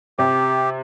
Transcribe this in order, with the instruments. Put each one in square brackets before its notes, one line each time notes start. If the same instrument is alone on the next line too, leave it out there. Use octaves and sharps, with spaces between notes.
[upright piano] C3 [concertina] G4